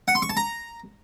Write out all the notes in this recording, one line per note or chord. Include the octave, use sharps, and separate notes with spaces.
F#5
C6
C#6
A5
A#5